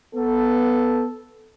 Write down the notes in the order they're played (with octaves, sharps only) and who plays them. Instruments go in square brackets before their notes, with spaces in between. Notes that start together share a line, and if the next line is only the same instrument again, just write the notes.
[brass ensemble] B3 A4